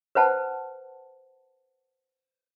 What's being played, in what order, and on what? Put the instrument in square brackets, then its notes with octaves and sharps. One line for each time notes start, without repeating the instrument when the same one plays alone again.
[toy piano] B4 C5 F#5 A5